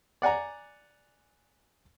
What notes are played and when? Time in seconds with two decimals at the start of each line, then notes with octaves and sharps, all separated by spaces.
0.22 D5 F#5 G#5 A#5